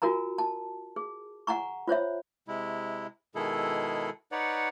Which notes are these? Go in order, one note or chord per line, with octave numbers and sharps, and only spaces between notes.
F4 F#4 A#4 G#5 A#5
A5
G#4
F#5 G#5 A#5 C#6
F4 C5 C#5 E5
C3 G#3 E4
B2 D#3 G#3 E4 G#4 A4
D#4 B4 C#5 D5 F#5